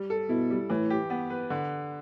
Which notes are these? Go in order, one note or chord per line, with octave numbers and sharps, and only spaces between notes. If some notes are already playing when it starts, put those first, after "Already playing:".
Already playing: G3
A4
B2 E4
G3
A2 E3
G4
B3
B4
D3